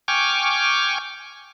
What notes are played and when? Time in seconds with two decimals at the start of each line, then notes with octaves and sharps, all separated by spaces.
0.08 G5 G#5 C#6 D6 F6